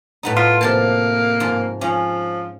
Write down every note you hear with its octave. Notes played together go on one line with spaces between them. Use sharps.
A2 B3 D#4
F4 E5
C3 F3 A#3 A5
G#2 F3
F3 C#4